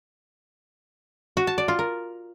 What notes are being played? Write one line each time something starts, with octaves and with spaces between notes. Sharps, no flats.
F#4
A5
D5
F4
A#4